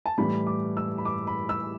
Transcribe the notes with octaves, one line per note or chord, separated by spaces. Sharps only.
A5
A2 E3 G3 B5
D6
E6
B5
D6
B5
E6